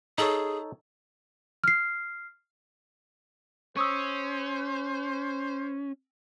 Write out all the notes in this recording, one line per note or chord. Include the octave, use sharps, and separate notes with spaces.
D#4 G#4 A4 C#5
F6 C7
C#4 C5 C#6 D#6 E6